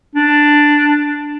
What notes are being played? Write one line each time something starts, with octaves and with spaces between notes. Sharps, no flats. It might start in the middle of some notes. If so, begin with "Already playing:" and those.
D4